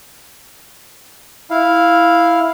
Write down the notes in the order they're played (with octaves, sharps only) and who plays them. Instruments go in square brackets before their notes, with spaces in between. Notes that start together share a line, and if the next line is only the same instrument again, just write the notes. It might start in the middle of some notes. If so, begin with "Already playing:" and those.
[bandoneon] E4 F5